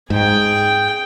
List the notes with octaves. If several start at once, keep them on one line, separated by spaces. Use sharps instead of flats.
G#2 G#4 G5